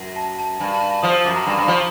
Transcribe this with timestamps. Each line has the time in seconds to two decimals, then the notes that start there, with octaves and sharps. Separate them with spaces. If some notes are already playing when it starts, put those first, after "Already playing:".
Already playing: F#2
0.16 A5
0.38 A5
0.60 G2 G#5
0.74 A5
0.89 A5
1.03 F3 D#6
1.13 E6
1.25 F#2 D6
1.36 A#5
1.47 G2
1.58 G2
1.68 F3